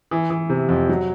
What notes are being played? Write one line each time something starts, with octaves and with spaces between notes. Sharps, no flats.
E3
E3
C3
F2
F#3